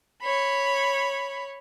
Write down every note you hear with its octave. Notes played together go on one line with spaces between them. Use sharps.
C#5 B5